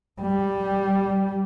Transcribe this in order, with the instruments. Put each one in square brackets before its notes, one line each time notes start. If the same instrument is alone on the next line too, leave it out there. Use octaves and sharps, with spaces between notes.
[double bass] G3